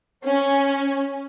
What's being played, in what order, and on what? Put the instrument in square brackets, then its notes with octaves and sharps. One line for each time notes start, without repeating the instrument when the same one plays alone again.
[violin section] C#4